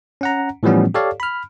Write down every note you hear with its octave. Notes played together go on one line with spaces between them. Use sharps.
C#4 F#5 A#5
A2 E3 F3 G3 B3 C#4
G4 A4 C#5 D5 F5
B5 F6